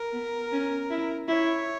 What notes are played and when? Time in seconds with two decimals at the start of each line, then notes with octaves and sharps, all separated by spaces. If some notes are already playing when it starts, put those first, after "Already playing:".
Already playing: A#4
0.13 B3
0.52 C#4
0.90 E4
1.28 E4 C#5